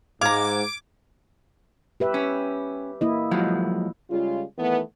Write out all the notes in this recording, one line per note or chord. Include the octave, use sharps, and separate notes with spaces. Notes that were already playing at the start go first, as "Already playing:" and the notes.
G#2 F5 A#5 D6 G#6
G4 B4 E5
C#4
A#3 E4 D#5
F3 F#3 G#3
C#3 G3 G#3 F4
D#3 E3 A3 B3